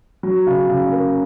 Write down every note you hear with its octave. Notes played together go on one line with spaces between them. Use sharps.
F#3
C#3
C#3
A#3